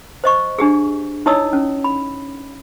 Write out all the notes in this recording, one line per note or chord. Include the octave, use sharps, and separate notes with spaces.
C5 D#5 C#6
D4 G4 G#4
D#4 E4 C#5 D#5 D#6 E6
C#4
B5